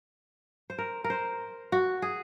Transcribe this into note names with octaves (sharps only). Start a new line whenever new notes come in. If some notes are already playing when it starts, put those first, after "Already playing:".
C5
A#4
A#4
C5
F#4
G#4